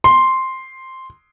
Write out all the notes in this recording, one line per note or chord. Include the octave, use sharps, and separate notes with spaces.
C6